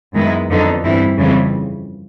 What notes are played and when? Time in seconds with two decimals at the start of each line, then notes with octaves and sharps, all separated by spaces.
0.15 F#2 D#3 G#3 B3 E4
0.49 F2 D3 F#3 B3 D#4
0.83 G2 E3 G3 C4 E4
1.17 F2 C#3 E3 G3 C4